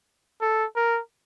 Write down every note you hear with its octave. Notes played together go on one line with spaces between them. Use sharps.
A4
A#4